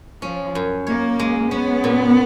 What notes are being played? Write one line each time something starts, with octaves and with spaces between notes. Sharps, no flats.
F3 C#4
F#2
A#3 C#5
G#3
B3 C#4
A#2